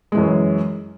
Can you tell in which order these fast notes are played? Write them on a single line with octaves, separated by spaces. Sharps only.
G#3 E3 F#2